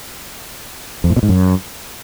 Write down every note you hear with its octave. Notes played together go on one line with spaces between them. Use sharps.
F2
A2
B2
G#2
F#2